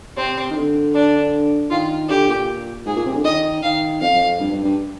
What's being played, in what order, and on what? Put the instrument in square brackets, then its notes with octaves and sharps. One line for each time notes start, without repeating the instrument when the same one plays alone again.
[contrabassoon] C3 [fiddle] C4
[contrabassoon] D#3
D3
[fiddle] D4
[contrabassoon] D#3 [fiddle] F4
[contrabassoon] D3 [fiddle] G4
[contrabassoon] A#2
[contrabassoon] G#2 [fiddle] G#4
[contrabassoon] A#2
C3
D3
[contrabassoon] D#3 [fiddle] D#5
[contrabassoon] D#3 [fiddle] F5
[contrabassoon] F2 [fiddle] F5
[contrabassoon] F2
G2
G2
G2